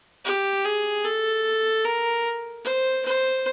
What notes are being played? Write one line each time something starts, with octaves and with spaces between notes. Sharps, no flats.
G4
G#4
A4
A#4
C5
C5